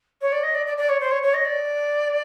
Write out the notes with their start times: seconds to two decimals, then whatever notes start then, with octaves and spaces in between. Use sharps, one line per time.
0.21 C#5
0.32 D5
0.43 D#5
0.55 D5
0.66 D5
0.77 D5
0.89 C#5
1.00 C5
1.11 C#5
1.23 C#5
1.34 D#5
1.45 D5